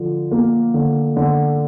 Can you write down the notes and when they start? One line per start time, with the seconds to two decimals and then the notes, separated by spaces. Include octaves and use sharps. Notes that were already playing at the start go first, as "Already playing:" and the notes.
Already playing: D3 F3
0.31 A#3
0.74 D3
1.17 D3